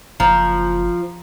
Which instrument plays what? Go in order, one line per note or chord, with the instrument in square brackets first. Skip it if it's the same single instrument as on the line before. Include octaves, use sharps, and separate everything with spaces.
[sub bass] F#1 [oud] F3 [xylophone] A#5